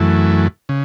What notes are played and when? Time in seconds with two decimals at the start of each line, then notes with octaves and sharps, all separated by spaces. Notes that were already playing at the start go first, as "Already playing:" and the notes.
Already playing: F#2 E3 A3
0.69 C#3